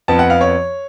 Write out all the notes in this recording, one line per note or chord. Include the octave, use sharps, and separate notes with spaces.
F2 F3 B3 A5
F#5
F5
C#5